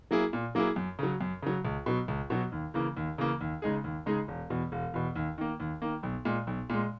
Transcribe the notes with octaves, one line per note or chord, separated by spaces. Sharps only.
F#3 A#3 E4 G#4
A#2
F#3 A#3 E4 G#4
F#2
C#3 F#3
F#2
C#3 F#3
C#2
B2 F#3
C#2
B2 F#3
D#2
C#3 E3 A#3
D#2
C#3 E3 A#3
D#2
C#3 G#3 D#4 G#4
D#2
C#3 G#3 D#4 G#4
E1
E2 B2
E1
E2 B2
D#2
D#3 A#3
D#2
D#3 A#3
B1
A#2 G#3
B1
A#2 G#3